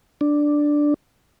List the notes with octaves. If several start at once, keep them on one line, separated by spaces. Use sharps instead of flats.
D4